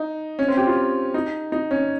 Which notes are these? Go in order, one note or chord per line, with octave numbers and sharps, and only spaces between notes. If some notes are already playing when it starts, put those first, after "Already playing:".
Already playing: D#4
C#4
C4
G4
F4
D#4
D#4
C#4